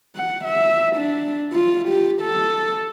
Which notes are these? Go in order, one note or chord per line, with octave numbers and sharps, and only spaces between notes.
F#5
E5
D4
F4
G4
A4